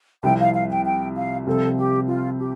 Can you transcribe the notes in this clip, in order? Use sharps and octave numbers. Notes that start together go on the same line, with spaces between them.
C2 C3 F3 C4 E4 G5
F5
F5
G5
G5
F5
C2 C3 F3 C4 A4
G4
F4
G4